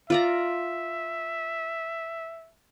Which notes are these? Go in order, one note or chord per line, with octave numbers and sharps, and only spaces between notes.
F4 D5 E5 A#5